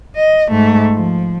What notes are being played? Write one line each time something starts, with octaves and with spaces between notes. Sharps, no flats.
D#5
G#2 A3
F3